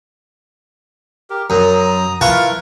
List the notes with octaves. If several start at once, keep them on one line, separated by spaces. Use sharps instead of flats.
G4 A#4
F#2 A#5 D#6
E4 F4 A#4 B4 A5 C#6